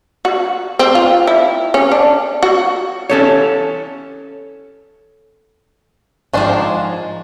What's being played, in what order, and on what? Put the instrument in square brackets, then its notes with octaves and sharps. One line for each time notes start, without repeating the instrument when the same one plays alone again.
[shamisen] F#4
C4
F4
E4
C#4
D4
F#4
[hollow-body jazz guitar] C#4 A4 C#5
[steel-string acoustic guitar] G#2 F3 G#3 [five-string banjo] D#3 D4 C5